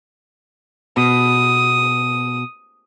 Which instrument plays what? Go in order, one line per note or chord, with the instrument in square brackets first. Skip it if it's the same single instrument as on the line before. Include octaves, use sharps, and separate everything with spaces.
[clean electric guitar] B2 [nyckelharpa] D#6